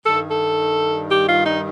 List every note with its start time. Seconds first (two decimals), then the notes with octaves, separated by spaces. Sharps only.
0.06 G2 D#3 G3 A4
0.30 A4
1.10 G4
1.27 F4
1.45 D#4